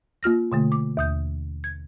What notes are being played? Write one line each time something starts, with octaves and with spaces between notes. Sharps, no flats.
A#3 F4 F6 A#6
B2 D3 A3
D6
D#2 D#6 G6
G#6